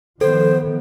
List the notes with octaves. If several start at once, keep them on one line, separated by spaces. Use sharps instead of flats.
D#3 F3 B3 A4 C5